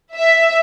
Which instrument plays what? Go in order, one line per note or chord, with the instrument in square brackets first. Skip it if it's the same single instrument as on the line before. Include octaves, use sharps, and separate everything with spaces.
[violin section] E5